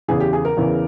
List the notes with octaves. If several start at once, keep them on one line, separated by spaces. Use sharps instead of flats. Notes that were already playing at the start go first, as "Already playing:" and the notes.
E2 C#3 E3 G#4
G4
G#4
A#4
E2 C#3 E3